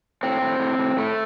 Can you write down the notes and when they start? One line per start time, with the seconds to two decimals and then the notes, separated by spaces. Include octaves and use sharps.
0.23 A2 C4
0.42 A2
0.60 A2
0.79 A2
0.97 A2 A3